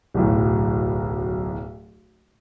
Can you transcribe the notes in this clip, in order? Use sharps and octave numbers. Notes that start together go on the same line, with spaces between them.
D1 B1 A2